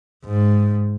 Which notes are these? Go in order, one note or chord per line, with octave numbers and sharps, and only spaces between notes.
G#2